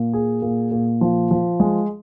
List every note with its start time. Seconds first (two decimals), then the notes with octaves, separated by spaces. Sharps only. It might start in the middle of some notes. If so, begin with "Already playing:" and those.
Already playing: A#2
0.13 G#4
0.42 A#2
0.71 A#2
1.01 F3
1.31 F3
1.60 G#3